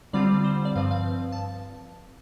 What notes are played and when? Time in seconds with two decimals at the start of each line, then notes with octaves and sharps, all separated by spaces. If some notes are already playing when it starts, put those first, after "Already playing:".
0.13 D3 G3 C4 F4 D5
0.44 C5
0.65 D5
0.75 G2 F3 C4 F5
0.91 F5
1.32 A5